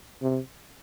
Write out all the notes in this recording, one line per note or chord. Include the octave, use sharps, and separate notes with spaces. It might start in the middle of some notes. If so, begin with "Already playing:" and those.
C3